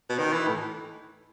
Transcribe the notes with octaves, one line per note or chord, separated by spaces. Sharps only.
B2
D#3
E3
A2